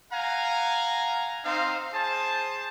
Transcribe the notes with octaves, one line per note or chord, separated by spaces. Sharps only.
F5 F#5 G#5 A#5
C4 D#4 C5 F5
G#4 C5 A5